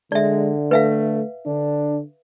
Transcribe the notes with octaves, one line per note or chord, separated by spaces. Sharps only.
D3 G#3 D5 E5
A3 B4 E5 F5
D3 D4